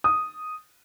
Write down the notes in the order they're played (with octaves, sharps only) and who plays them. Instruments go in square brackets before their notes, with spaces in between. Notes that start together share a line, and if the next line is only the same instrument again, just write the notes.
[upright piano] D#6